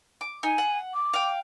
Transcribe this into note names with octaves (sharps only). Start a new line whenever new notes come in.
D6
D#4 G#5
F#5
D6
F5 G5